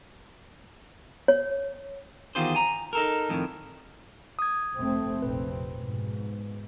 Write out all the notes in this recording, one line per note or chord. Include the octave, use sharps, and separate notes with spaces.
C#5
E2 D#3 F4 G4 G#4 C5
G#5 A#5
D#4 A4 A#4
F2 A2 D#3
D#6 G#6
F1 A3 C4
F1 A#1 C4 B4
G#2 B2